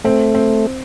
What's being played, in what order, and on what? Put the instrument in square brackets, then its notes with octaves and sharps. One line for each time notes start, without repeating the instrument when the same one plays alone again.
[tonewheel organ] A3 [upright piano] C4
[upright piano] C4